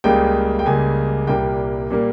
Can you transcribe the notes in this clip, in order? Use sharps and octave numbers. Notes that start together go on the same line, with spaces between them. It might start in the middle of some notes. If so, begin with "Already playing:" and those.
C#2 C#3 G3 A#3 G5
G5
C#2 C#3 G3 A#3 G#5
C2 A#2 G3 A#3 G5
A#2 G3 A#3